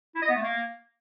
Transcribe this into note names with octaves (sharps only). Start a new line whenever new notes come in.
E4
D#5
B3
A3
A#3